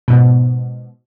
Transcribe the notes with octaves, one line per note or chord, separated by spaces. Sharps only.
G#2 B2